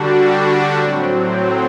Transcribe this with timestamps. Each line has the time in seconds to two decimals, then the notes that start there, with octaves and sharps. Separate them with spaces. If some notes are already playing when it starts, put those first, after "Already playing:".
Already playing: D3 G3 D4 F#4
0.76 A2 F#3 C4